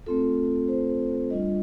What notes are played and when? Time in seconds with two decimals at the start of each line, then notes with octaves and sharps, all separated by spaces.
0.06 A3 C4 F4 A4
0.68 C5
1.30 G3 D4 F4 D#5